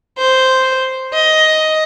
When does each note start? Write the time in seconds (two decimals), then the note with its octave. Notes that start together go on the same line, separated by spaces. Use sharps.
0.18 C5
1.14 D#5